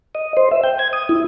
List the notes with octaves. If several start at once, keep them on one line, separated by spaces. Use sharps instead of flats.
D#5
C5
E5
G5
G#6
D#6
E4